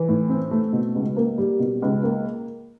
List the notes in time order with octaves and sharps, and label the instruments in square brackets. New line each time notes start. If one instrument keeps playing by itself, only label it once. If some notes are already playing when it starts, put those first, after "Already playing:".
Already playing: [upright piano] E3
A2
C4
A3
B2
C#2
A#3
G3
B2
C#2
A#3